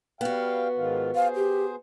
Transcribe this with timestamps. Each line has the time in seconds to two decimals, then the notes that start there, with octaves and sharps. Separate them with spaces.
0.21 G3 B3 F#4 F5 G5
0.76 G#2 D#3 F4
1.15 G#4 C5 F5
1.36 G4